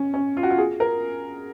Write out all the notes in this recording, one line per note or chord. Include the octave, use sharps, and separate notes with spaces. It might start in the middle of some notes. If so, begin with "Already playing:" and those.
Already playing: C#4
C#4
F4
F#4
F4
G#4
A#4